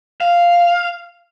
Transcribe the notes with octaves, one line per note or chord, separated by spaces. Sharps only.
F5